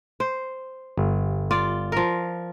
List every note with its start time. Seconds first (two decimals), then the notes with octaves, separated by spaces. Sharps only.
0.20 C5
0.97 G1
1.51 F4 D5
1.92 F3 A#4